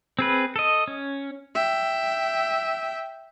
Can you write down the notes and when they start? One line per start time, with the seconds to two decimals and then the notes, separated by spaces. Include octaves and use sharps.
0.19 C4 G#4 B4
0.56 A4 D#5
0.88 C#4
1.55 E5 G5